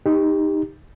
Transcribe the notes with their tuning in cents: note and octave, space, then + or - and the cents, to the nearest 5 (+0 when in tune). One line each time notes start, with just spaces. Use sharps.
D#4 +0 G4 +20